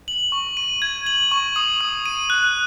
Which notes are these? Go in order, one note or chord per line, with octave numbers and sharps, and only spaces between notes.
F#7
C#6
D#7
G#6
F#7
C#6
D#6
D#6
D#7
F#6